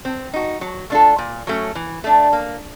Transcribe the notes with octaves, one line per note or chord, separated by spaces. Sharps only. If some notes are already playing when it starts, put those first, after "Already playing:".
C4
D#4 F#4
F#3
A3 D4 F4 A4
A#2
F#3 A3 C#4
E3
A3 D4
A#3